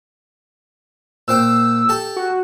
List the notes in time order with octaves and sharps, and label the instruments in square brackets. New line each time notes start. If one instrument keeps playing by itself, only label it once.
[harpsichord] A#2 C5 G5 [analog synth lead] E6
[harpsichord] G4 A4 A5
[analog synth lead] F#4